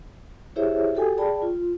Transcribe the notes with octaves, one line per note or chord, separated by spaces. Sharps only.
E4 G4 G#4 C5 C#5 E5
F#4 G4 A4 G5 G#5
G#4 D5 G5 A5 B5
F4